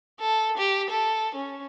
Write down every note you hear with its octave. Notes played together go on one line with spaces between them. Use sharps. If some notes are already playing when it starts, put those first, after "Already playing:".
A4
G4
A4
C#4